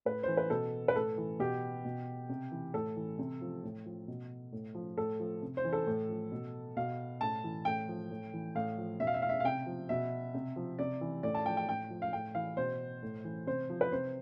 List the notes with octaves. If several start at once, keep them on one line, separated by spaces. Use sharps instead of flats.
A2 B4
E3 C5
B4
B2 A4
B4
A2 A4
E3
B2 G4
B2
C3
E3
A2 A4
E3
C3
F3
A2
F3
B2
A2
F3
A2 A4
F3
C3
C5
E3
A4
A2
F3
B2
B2 F5
A2 A5
E3
A2 G5
F3
A2
E3
A2 F5
F3
B2 E5
F5
E5
F5
E5
F5
C3 G5
F3
B2 E5
C3
F3
C3 D5
E3
A2 D5
A5
F3 G5
G5
A2 G5
F3
F5
A2 G5
E3 F5
B2 C5
A2
E3
C3 C5
F3
B4
C3 C5